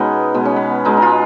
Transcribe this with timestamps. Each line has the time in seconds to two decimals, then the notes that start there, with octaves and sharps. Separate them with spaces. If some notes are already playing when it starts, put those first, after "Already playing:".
Already playing: B2 G#3 B3 C#4 D#4
0.34 B2 G#3 B3
0.45 C#4
0.56 B3
0.85 B2 G#3 D#4
0.97 D#4
1.02 F4